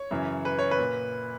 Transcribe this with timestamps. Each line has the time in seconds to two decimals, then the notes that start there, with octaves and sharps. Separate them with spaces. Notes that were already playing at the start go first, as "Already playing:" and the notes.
Already playing: C#5
0.11 F#2 C#3 E3
0.45 B4
0.59 C#5
0.71 B4
0.78 A#2